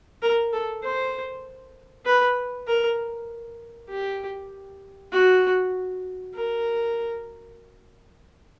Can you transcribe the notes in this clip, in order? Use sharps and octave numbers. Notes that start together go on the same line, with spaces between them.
A#4
A4
C5
B4
A#4
G4
F#4
A#4